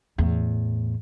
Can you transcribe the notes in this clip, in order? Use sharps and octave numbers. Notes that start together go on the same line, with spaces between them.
E2 A2